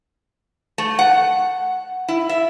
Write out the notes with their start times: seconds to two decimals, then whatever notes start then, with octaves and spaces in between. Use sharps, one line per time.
0.78 A3
0.99 F#5
2.08 E4
2.29 E5